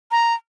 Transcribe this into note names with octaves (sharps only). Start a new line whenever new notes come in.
A#5